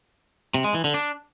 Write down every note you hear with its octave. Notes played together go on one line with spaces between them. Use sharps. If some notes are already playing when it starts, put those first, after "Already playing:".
C3
G#3
E3
D3
D4